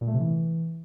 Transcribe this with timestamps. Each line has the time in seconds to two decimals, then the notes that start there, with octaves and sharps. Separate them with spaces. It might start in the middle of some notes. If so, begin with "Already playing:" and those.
0.01 A#2
0.07 A3
0.14 C3
0.20 E3